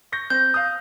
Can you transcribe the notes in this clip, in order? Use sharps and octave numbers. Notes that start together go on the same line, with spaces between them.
C#6 G6 A#6
C4 G6
F5 D#6